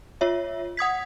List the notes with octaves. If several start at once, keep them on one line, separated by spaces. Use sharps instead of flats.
F4 C#5 E5
F#5 D#6 G#6 B6